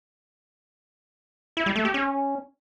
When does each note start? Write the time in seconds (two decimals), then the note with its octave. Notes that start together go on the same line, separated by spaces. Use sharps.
1.57 E4
1.66 G3
1.76 A3
1.85 G4
1.94 C#4